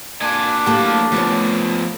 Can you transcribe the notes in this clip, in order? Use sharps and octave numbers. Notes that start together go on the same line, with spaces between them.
A#3 D4 G#5
A2 F#3 A#3 G4 A5
F3 A3 B3 C#4